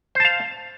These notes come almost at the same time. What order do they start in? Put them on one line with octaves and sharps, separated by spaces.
C5 A5 F5